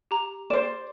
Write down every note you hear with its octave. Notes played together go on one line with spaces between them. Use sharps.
G4 A#5
C5 D5 E7